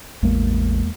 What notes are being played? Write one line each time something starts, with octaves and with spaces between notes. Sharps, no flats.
A1 E2 G#3 A#3